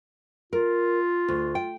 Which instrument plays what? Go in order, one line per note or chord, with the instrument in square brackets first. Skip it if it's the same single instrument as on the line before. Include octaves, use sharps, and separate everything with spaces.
[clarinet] F4 [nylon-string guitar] A#4
[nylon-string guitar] D2
G5